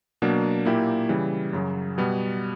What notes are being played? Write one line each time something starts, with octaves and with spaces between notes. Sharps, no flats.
B2 F#3 A#3 D4
A#2 A#3 E4 G4
C#3 E3 G3
F#2 C#3 F#3
B2 G3 B3